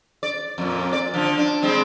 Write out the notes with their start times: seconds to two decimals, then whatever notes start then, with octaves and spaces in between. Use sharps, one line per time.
0.23 D5
0.58 F2 A#2
0.93 D5
1.14 D3 F3
1.37 D4
1.62 G3 G#3 C4